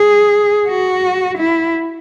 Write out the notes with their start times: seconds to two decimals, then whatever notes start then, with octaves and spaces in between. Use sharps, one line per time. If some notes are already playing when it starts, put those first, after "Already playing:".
Already playing: G#4
0.67 F#4
1.38 E4